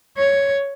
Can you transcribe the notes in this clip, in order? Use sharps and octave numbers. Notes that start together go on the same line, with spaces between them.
C#5